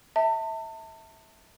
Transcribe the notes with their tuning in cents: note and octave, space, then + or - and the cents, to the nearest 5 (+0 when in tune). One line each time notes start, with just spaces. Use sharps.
E5 -25 A5 +35